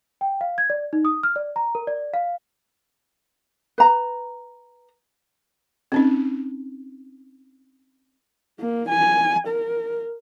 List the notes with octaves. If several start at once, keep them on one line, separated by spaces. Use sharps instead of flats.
G5
F5
G#6
D5
D#4
D#6
F6
D5
A#5
A#4
D5
F5
B4 A#5
C4 C#4 D#4
A#3
G#5
A#4